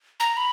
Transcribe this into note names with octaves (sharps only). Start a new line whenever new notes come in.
A#5
B5